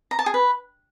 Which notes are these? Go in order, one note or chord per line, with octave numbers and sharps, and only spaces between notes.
A#5
A5
G#4
B4